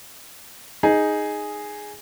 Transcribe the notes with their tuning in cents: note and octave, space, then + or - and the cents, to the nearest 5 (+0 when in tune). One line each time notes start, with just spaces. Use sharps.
D#4 +0 G#4 +0